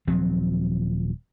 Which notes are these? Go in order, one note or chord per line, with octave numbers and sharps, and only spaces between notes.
D#1 F3 F#3 C4